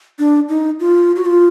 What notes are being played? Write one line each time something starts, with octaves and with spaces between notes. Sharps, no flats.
D4
D#4
F4
F#4
F4